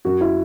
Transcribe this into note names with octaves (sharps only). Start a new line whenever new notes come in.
F#2 F#4
E4